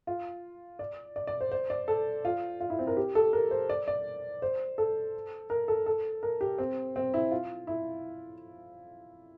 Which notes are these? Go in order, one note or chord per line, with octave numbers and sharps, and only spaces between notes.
F4
D5
D5
D5
C5
C5
D5
A4
F4
F4
E4
C4
A#4
G4
A4
A#4
C5
D5
D5
C5
A4
A#4
A4
A4
A#4
G4
C4
C4
E4
F4
E4